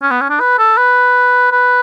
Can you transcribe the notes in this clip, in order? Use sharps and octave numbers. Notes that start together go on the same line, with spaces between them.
C#4
B3
C#4
D4
B4
A4
B4
B4